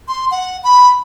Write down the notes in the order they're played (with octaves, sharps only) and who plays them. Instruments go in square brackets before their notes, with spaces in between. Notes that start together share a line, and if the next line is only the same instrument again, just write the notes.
[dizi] C6
F#5
B5